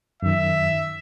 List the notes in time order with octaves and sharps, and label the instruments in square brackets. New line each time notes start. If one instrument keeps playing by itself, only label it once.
[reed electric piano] F#2 D#3 [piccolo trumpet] E5